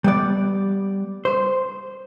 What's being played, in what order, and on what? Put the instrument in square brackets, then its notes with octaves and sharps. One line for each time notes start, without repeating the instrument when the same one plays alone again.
[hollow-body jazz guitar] G3 B3 D5
C5